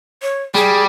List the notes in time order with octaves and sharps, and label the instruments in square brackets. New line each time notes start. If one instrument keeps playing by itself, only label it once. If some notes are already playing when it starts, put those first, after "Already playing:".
[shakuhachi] C#5
[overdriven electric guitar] G3 [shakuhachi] G#4